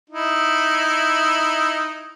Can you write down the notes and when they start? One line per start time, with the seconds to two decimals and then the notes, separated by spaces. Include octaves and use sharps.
0.10 D#4 E4